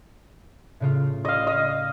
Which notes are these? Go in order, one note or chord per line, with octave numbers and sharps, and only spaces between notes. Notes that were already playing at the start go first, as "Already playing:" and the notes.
A2 C#3 F4
D#5 F5
D#5